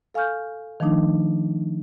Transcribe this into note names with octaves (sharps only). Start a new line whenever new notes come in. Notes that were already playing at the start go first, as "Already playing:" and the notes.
A4 F5 G#5 C#6 F6 G6
D#3 F3 A3 D4 D#4